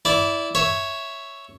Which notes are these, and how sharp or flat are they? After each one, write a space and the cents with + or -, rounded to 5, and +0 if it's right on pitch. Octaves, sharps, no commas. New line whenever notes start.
E4 +0 D5 -20
C#5 +0 E5 +0